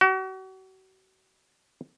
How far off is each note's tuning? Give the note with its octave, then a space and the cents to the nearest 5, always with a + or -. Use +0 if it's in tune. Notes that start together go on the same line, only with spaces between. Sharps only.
F#4 +40